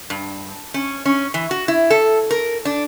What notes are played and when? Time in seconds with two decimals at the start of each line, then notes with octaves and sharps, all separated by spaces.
0.10 G2
0.74 C#4
1.05 C#4
1.34 E3
1.51 F#4
1.68 E4
1.90 A4
2.31 A#4
2.65 D4